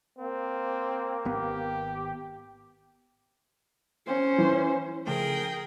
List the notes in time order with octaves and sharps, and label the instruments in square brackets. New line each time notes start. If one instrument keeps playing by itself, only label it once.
[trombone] A#3 [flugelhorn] C4
[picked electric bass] G#1 B3 [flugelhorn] G4
[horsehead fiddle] C#4 C5
[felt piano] E3
[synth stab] C#3 F3 A3 [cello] G#4 A#4 [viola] G5